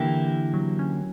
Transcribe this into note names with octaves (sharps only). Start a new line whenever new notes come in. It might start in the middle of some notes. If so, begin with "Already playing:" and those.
Already playing: D3 E3 A#3 E4 G4
F#3
C#4